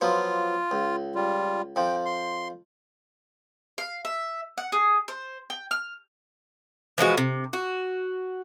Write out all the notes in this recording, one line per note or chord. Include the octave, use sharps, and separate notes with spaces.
F3 F#3 B3 F4
C#2
G3 F4
F2 F3 G5
C6
F5
E5
F#5
G#4
C5
G5
F6
E3 F3 G#3 F#4
C3
F#4